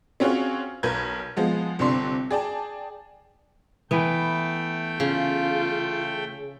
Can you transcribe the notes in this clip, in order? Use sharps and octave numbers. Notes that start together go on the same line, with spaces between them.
C4 C#4 F4 F#4 G#4 C#5
B1 A#4 B4 G6 G#6
F3 G#3 B3
G1 C3 D4 C6
G#4 D5 G5 A5
E3 A3 B3 G5
C#3 F4